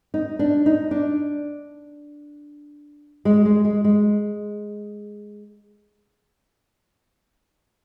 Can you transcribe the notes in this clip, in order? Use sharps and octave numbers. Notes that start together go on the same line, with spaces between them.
D#4
D4
D#4
D4
G#3
G#3
G#3
G#3